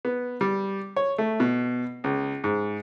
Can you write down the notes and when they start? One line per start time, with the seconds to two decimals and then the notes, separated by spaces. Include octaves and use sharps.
0.05 B3
0.41 G3
0.96 C#5
1.18 A3
1.40 B2
2.04 C#2
2.44 G#2